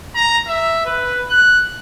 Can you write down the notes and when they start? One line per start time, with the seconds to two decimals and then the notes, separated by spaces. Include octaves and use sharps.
0.16 A#5
0.48 E5
0.85 B4
1.30 F#6